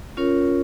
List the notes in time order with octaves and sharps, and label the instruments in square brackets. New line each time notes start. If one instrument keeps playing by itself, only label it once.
[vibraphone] C#4 F4 A#4 C#5